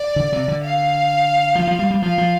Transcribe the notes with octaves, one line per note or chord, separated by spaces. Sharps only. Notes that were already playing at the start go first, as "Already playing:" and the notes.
Already playing: D5
D3
C3
D3
F5
F3
F3
G3
G3
F3 F5
F3